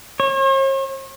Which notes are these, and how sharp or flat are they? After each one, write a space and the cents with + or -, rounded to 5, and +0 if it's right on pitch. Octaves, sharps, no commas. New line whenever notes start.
C#5 -45